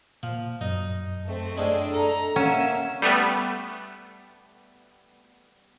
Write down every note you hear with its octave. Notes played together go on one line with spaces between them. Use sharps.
A#2 F3
F#2 D#4
A3 C4
A2 G#3 D4 D#5
A4 A#5
A#3 C#4 E5 F#5 E6
G3 A3 B3